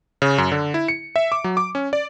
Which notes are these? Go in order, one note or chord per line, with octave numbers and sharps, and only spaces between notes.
C#3
F#2
D3
E4
C#7
E5
D6
F#3
D6
C#4
D5